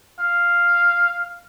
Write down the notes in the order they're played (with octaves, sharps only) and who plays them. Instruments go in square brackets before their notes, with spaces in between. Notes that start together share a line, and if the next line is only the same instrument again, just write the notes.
[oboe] F5